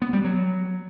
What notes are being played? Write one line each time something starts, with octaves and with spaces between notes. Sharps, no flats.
B3
G3
F#3